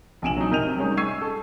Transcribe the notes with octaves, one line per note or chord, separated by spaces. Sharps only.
A#1 C3 G#5 D7 E7 F#7
F#3 D#4
C3 A#4 D#5 G6 D#7 F7
G3 G#3 C#4 D#4
C#6 E6 G#6 C7 D#7
A4